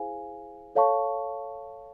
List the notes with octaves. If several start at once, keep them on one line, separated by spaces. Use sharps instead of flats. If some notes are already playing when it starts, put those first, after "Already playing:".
Already playing: E4 G#4 C5 F5 G#5
A4 C#5 F5 A5 C#6